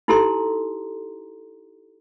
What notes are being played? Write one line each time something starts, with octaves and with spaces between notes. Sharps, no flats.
D#4 E4 G4 A4 A#5 C6